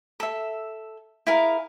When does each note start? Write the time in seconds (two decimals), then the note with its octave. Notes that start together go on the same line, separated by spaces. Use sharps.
0.20 A4 E5
1.27 E4 G#4 A#4 F5